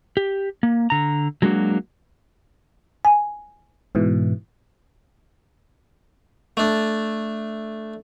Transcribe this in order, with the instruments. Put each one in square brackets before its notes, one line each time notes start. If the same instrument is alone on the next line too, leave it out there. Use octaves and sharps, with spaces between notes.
[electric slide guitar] G4
A#3
D3 A#5
F#3 G#3 A#3 D4 F#4
[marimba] G#5
[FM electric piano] G#2 B2 E3
[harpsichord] A3 D4